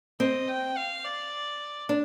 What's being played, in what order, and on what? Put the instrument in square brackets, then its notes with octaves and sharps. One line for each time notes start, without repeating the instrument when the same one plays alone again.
[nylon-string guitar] C4 [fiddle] D#5
[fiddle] G5
F5
D5
[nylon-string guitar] D4